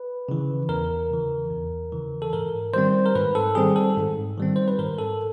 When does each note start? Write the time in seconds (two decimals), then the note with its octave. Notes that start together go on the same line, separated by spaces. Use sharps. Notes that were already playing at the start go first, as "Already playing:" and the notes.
Already playing: B4
0.29 C#3 E3
0.69 E2 A#4
1.11 C#3 E3
1.50 E2
1.92 C#3 E3
2.22 A4
2.33 G#2 A#4
2.73 D#3 G3 C4 C5
3.06 A#4
3.15 G#2 B4
3.35 A4
3.55 D#3 G3 C4 G#4
3.76 A4
3.97 G#2
4.38 D#3 G3 C4
4.56 C5
4.68 B4
4.79 G#2 A#4
4.99 A4